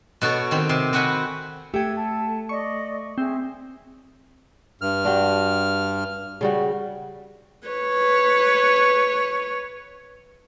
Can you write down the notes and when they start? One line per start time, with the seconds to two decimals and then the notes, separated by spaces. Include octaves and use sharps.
0.21 B2 F#4 A4 C#5
0.51 D#3 C4
0.69 C3 C6
0.93 C4 F#4 F#5 G#5 B5
1.74 A3 G4 G5 E6 G#6
1.96 A5
2.49 D5 D#5 C#6
3.18 C4 G#4 E5
4.81 G2 F6
5.05 D4 F#4 G4
6.41 C#3 G3 F#4
7.67 B4 C#5